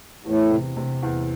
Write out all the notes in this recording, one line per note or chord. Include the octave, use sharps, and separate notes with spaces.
E2 A2
C3
C3
E2